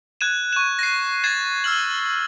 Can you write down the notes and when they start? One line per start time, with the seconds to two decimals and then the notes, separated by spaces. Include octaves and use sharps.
0.21 F#6 G#6 D#7 E7
0.53 C#6 E7
0.79 A#6 C7
1.24 G#6 A6 C7 E7
1.64 E6 F6 F#7